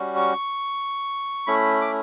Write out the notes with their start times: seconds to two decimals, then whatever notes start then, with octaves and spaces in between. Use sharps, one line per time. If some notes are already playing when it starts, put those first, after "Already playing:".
Already playing: G3 C#4 F#4
0.16 C#6
1.47 A3 C#4 E4 B5
1.81 D6